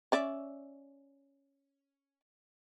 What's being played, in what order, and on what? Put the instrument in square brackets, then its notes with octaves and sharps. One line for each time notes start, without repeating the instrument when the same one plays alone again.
[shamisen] C#4 D5 E5